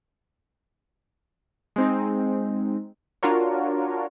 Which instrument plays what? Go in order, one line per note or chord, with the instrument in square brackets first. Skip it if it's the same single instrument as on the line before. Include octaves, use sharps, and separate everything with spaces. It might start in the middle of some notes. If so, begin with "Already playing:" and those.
[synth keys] G#3 C4 D#4
[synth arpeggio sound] D4 F4 F#4 A#4 C#5